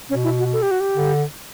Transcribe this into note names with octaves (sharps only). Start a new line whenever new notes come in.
B2 C#4
E4
F#4
A4
G4
F#4
G4
D3